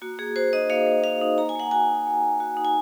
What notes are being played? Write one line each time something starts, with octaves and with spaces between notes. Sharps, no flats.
A#3 F#4
A#3 G#4
F#4 C5
D#4 D#5
A#3 F5
A#3
F#4 F5
D#4
A#3 A#5
G#5
A#3 F#5
F#4 G#5
D#4
A#3
A#3
F#4
D#4
G#5